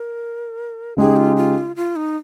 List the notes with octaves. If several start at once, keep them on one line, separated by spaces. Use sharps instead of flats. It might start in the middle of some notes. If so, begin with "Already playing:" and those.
Already playing: A#4
C#3 G#3 D#4 G4 G#4
F4
F4
F4
D#4